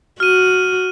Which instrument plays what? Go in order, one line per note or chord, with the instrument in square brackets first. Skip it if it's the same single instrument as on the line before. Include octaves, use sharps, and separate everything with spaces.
[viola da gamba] F#4 [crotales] F6 D#7